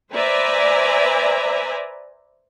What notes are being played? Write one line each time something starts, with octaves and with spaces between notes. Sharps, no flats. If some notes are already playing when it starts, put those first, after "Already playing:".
B4 C5 D5 E5 G#5 A#5